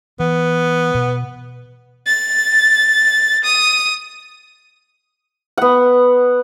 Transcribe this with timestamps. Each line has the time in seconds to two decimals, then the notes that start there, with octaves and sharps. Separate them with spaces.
0.20 E3 B3
0.95 B2
2.06 A6
3.44 D#6
5.58 B3 F#5